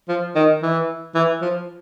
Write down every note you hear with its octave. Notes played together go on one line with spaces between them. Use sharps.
F3
D#3
E3
E3
F3